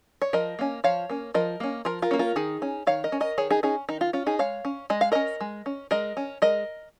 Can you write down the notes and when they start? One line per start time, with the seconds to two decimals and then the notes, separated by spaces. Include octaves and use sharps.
0.22 C#5
0.33 F3 A#4 D#5
0.59 A#3 C#4
0.84 F3 C#5 F5
1.10 A#3 C#4
1.34 F3 A#4 D#5
1.60 A#3 C#4
1.85 F3 F4 A#4
2.02 F4 A#4
2.11 A#3 C#4
2.19 F4 A#4
2.36 D#3 D#4 G#4
2.62 C#4
2.87 D#3 C#5 F5
3.04 A#4 D#5
3.12 C#4
3.21 A#4 D#5
3.38 D#3 G#4 C#5
3.51 D#4 G#4
3.63 C#4 D#4 G#4
3.89 D#3 D#4
4.01 F4
4.13 C#4 F4
4.26 D#4 G#4
4.39 G#3 C#5 F5
4.65 C#4
4.90 G#3 D#5
5.01 F5
5.12 C#4 A#4 D#5
5.41 G#3
5.66 C#4
5.91 G#3 A#4 D#5
6.17 C#4
6.42 G#3 A#4 D#5